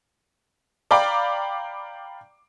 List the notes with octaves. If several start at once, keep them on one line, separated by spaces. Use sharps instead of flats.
D5 F5 G5 A#5 B5 D6